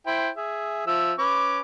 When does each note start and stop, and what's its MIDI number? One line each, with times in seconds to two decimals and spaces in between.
0.06 0.29 64
0.06 0.29 72
0.06 0.29 79
0.36 0.82 68
0.36 0.82 76
0.87 1.13 53
0.87 1.13 76
0.87 1.13 88
1.18 1.60 61
1.18 1.60 71
1.18 1.60 86